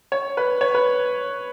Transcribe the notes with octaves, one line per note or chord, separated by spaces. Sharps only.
C#5
B4
C#5
B4